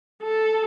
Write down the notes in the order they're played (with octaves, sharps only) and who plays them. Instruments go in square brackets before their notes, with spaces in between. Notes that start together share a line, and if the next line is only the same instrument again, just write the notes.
[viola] A4